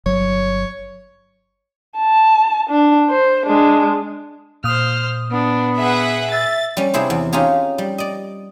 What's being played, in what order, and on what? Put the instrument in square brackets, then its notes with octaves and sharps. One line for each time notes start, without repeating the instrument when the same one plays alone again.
[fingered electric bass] G1 F#3 [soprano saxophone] C#5
[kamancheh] A5
D4
C5
G#3 D4
[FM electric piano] A#2 D#6 [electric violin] C5 F6
[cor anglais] B3 [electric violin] D4
[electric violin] G#4 B4 [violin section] E5 F#5
[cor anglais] E5 [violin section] A6
[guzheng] G3 C#4
C3 E4 G#4 C5
E2
C#4 D#4 F4 G4 G#4
G3
D5 D#5